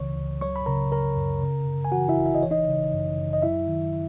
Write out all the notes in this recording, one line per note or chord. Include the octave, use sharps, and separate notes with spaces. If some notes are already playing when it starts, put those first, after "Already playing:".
Already playing: C#2 C#3 E3 C#5 C#6
C#2
F#3 C#5 C#6
B5
C#3 A#4 A#5
F#2 A#4 A#5
F#2
C#3
F#2
G#5
E3 F#4 F#5
E4 E5
G#1
E5
D#5
E3 C#5
D#4 D#5
C#3
F#2
F#2
D#5
F#3 E4 E5
D#3